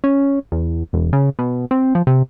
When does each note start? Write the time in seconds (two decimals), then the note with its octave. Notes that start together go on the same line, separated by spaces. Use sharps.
0.04 C#4
0.52 E2
0.93 E1
1.13 C#3
1.39 B2
1.71 C4
1.95 F3
2.07 C3